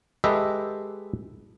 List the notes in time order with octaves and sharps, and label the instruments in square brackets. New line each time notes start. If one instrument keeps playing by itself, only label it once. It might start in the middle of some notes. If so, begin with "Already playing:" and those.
[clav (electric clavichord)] G#3 G4 A4 B4 D#5 E5